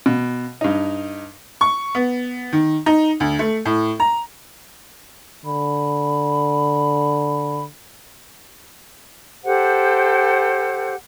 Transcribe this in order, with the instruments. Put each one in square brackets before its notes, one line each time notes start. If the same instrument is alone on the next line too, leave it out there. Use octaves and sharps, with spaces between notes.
[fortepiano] B2
G2 D#4
[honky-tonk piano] C#6
B3
D#3
D#4
D2
A3
A2
A#5
[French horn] D3 [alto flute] B5
[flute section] G4 A4 C5 F#5